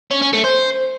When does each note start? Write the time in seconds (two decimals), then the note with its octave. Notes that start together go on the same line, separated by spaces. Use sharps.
0.11 C#4
0.22 C#4
0.33 A3
0.44 C5